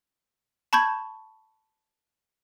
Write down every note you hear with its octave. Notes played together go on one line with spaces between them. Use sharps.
A5 B5 C#6 G6 G#6